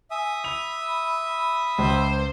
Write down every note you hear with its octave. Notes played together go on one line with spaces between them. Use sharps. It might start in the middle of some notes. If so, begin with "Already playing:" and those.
E5 G#5 D#6
B5 F7
C#2 C5